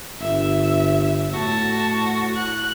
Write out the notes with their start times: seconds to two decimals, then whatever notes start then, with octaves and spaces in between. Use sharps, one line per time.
0.21 G1 E5
1.34 A2 F#4 A5
2.36 F#6